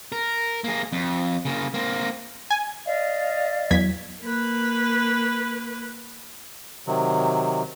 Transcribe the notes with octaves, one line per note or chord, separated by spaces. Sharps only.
A#4
A#3 G#4
F2
C#3 A#3
A#3 C4
G#5
D5 D#5 F5
E2 F#3 G#6 B6
A#3 B4
C3 D#3 F#3